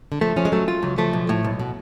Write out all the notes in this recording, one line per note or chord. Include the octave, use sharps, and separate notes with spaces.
D3
F3 A3
F3 C#4
G#3
F#3 A3
F4
C#2 F#3
F3 A3
B1
A2
B1
B2